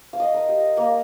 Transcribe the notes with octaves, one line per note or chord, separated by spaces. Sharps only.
F5
D#5
A#4
G4
A#3